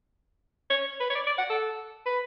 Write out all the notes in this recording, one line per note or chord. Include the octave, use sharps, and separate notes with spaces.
C#5
B4
C#5
D5
D5
F#5
A4
B4